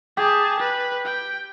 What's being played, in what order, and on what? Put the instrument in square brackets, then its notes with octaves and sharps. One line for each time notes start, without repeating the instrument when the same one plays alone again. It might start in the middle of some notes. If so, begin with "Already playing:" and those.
[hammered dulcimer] G4 [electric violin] G#4 A5
[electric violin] B4
G5